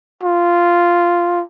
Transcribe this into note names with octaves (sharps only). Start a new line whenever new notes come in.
F4